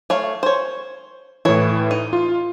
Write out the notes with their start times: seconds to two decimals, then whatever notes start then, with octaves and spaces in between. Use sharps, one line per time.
0.10 A3 C#5 F5
0.43 C5 C#5
1.45 A2 E3 E4 C#5
1.91 D#4
2.13 F4